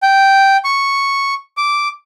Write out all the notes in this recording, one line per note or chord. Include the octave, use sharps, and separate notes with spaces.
G5
C#6
D6